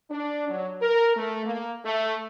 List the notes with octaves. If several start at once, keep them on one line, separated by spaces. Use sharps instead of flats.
D4
F#3
A#4
A3
A#3
A3